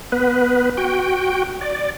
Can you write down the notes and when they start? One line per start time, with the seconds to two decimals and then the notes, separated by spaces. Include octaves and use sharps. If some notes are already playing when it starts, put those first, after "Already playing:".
0.12 B3 B4
0.77 F#4 G5
1.61 D5